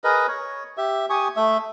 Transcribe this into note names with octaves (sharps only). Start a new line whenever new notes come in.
G#4 A#4 B4 D#5
C#5
G4 E5
G4 G#5 C#6 D#6
A3 E5